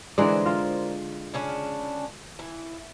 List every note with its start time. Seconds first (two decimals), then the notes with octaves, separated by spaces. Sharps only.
0.18 D3 E3 G#3 A#4 C5 D5
0.46 F4
1.34 C#3 C#4 D4
2.39 E3